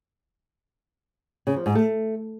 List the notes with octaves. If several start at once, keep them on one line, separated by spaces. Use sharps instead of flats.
C#3
F3
G#2
A3